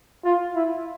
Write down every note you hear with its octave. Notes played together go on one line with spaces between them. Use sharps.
F4
E4